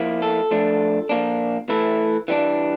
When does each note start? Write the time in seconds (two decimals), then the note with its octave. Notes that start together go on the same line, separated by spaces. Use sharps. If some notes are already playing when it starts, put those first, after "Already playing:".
Already playing: F3 A#3 E4
0.22 A4
0.51 F3 A3 D4
1.09 A#2 F3 A#3 D4
1.69 E3 A3 E4
2.28 E3 G3 D4